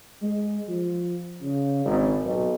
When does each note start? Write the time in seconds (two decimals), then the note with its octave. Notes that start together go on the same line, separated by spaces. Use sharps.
0.22 G#3
0.68 F3
1.42 C#3
1.85 G#1
2.24 B1